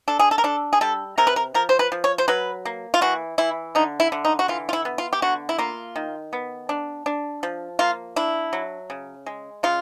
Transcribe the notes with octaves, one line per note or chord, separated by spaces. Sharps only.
D4 A4
G#4
A4
A#4
D4 A4
G#4
G3 A4
C3 A#4
B4
A#4
F3 A#4
C5
B4
F3
C#5
C5
F#3 B4
A#3
F4
E3 F#4
E3 E4
D3 D#4
E4
D3
D#4
F#4
E3 F4
F4
E4
B3
F4
G4
D3 F#4
E4
A#3 F4
D#3
B3
D4
D4
F3
A#3 F4
D4 E4
F#3
C#3
G#3
C#3 F4